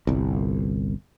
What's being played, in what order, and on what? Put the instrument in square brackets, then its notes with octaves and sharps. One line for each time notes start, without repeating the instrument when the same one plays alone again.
[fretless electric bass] G1 C2